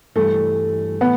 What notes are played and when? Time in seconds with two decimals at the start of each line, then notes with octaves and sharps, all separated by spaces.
0.16 G2 E3 G3 A3
1.01 A2 E3 B3